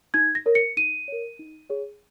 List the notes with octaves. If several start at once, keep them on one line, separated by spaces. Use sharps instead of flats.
D#4 G#6
A#6
A#4 C#5
C#7
D#4 D#7
A#4 C#5
D#4
G#4 C#5